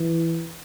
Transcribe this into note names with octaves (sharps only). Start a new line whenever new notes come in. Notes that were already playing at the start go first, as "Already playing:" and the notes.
Already playing: E3